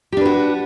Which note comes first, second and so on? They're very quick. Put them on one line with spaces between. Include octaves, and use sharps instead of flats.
G4 D4 B4 F#4